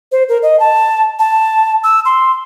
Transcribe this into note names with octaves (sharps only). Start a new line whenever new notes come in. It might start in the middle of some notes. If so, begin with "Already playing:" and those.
C5
A#4
D#5
A5
A5
E6
C6